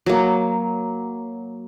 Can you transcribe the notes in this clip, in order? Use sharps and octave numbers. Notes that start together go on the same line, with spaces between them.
F#3 A#3